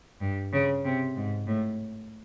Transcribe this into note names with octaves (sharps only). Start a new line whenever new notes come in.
G2
C#3
C3
G#2
A2